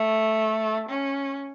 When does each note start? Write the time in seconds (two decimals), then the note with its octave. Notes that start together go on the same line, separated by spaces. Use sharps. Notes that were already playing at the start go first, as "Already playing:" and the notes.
Already playing: A3
0.89 C#4